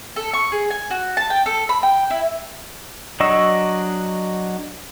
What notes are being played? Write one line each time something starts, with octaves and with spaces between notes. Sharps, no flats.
A4
C#6
G#4
G#5
F#4
A5
G5
A4
B5
G5
E4
F#3 D4 D#5 C#6 E6